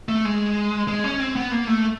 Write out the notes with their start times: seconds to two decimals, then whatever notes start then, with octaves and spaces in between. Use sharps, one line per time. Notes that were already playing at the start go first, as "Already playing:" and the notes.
0.09 A3
0.25 G#3
0.87 G#3
1.04 C#4
1.20 C4
1.36 B3
1.51 A#3
1.67 A3